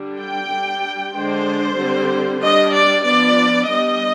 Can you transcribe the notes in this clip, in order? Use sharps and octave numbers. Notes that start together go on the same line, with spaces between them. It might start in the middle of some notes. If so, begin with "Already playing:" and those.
Already playing: D3 G3 D4
G5
G3 D4
D3 G#3 D4 C5
D3 G3 C4
G3 D4 D#5
D5
F3 B3 D4 D5
G3 B3 D4 D#5